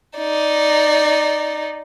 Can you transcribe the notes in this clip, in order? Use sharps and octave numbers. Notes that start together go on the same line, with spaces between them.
D#4 D5